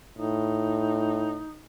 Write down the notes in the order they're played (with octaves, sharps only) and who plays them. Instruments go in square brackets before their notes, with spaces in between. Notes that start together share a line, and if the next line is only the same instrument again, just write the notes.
[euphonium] A2 [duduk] D#4